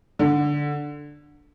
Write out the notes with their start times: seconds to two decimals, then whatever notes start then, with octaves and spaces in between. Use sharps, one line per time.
0.19 D3